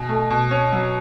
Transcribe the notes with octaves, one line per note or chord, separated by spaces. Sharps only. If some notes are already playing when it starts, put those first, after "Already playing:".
Already playing: B2 G#5
A3
B2
C#4
F#3